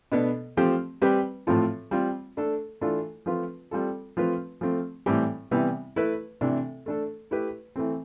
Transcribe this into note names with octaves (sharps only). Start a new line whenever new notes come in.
B2 B3 D4 A4
F3 A3 C4 G4
G3 C4 G4 B4
A2 F3 C4 F4 A4
G3 C4 F4
A3 D4 A4
E3 A3 D4 F4 A4
F3 A3 C4 F4 B4
G3 C4 F4 A4
F3 A3 C4 F4 B4
F3 A3 C4
A2 E3 G3 C4 G4
C3 E3 G3 B3
A3 E4 B4
C3 E3 A3 D4 A4
A3 D4 A4
A3 E4 G4 B4
E3 A3 C4